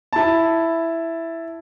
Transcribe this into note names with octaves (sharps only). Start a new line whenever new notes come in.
E4 A5